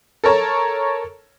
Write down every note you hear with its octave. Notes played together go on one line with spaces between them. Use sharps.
A4 A#4 C#5 A5 A#5